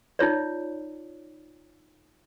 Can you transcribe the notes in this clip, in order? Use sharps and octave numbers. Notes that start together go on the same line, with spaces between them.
D#4 F4 C#5 D5